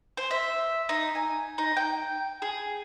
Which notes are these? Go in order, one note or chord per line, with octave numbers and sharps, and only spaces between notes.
C5
E5
D#4
G#5
D#4
G5
G#4